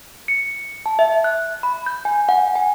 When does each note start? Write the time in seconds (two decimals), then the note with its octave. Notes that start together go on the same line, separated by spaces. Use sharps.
0.28 C#7
0.86 A5
0.99 E5
1.24 F#6
1.63 B5
1.86 G6
2.05 G#5
2.29 F#5
2.55 G#5